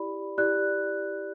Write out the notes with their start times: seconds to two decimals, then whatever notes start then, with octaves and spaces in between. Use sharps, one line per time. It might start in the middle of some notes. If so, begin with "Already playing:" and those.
Already playing: E4 G4 D5 B5
0.38 E4 G4 D5 F#6